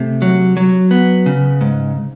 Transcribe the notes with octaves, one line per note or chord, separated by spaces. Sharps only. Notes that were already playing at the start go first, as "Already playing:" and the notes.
Already playing: C3 A3
F#3
F#3
B3
C#3
G#2